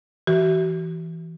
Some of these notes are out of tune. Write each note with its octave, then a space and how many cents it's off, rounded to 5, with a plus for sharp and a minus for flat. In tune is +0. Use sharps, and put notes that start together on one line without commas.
E3 +0 F#4 +35